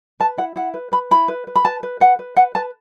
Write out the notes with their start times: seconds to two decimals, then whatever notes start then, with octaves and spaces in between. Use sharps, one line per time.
0.20 B4 A5
0.38 E4 F#5
0.56 E4 F#5
0.74 B4
0.92 B4 B5
1.11 E4 B5
1.28 B4
1.47 B4
1.56 B5
1.65 B4 A5
1.83 B4
2.00 B4 F#5
2.19 B4
2.36 B4 F#5
2.55 B4 A5